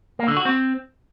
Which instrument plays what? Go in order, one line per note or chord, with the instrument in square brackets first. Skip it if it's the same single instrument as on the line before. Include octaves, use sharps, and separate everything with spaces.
[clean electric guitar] A#3
D3
F#4
C4